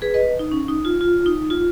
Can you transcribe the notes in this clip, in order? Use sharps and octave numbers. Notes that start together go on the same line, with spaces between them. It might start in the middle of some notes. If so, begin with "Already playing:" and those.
G#4 B4
B4 D#5
D#4
C#4
D#4
F4
F4
D#4
F4